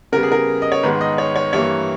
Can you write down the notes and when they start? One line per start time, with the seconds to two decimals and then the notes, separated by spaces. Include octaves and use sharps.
0.12 C#3 G3 B3 A#4
0.23 G#4
0.32 A#4
0.62 D#5
0.72 C#5
0.83 G#2 D#3 G#3 B3 B4
1.01 D#5
1.18 C#5
1.36 C#5
1.53 G2 E3 G3 A#3 C#5